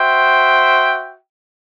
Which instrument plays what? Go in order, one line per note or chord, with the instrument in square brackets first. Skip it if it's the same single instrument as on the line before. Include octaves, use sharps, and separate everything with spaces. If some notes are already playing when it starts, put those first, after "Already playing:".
Already playing: [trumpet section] F#4 C5 E5 G5